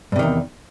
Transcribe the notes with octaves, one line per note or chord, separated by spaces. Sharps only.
E2 G2 C3 D#3